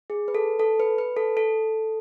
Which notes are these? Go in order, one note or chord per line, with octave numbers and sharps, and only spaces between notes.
G#4
B4
A4
A4
B4
B4
A4
A4